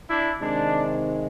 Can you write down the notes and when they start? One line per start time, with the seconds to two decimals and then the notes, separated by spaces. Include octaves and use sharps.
0.09 D4 E4
0.40 C3 D#3 G#3 D4